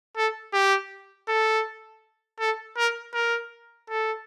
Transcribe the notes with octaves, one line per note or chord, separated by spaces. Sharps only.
A4
G4
A4
A4
A#4
A#4
A4